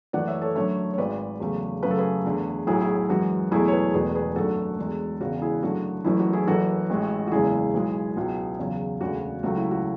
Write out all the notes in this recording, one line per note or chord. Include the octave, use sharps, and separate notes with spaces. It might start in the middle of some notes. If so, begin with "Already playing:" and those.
F#1 F#2 E3 A3 D5 F#5
C#5 E5
A4 C#5
F#2 D3 A3 C#5 E5
C#5
G#1 G#2 G#3 B4 D5
E2 C#3 F#3 A3
F#2 C#3 F#3 A3 B4
A4
G#4 B4
E2 D3 A3
B1 A2 F#3 E4 G#4
E4 G#4
F#2 E3 G#3 F#4
E2 B2 F#3 A3 E4 G#4
C#5
G#4 B4
E1 E2 B2 A3 G#4 B4
G#4 B4
G#1 F#2 D3 A3 F#4 A4
E2 D3 G#3
E1 E2 C#3 F#4
E4 G#4
F#2 D3 A3 F#4
F#1 F#2 E3 A3 E4
F#4
E4 G#4
F#1 F#2 E3 F#4 A4
A1 A2 G#3
F#4
F#1 E2 C#3 G#3 E4 G#4
B1 B2 G#3
C#2 B2 F#3
E2 C#3 F#3
E1 D2 C#3 F#4
C#2 C#3 F#3 A3 F#4
E4
F#4